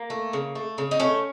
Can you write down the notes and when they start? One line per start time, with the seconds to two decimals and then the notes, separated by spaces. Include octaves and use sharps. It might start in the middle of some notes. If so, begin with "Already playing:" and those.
Already playing: A#3
0.10 A3
0.33 C#3
0.55 A3
0.78 C#3
0.91 D#4
1.00 A3 C#4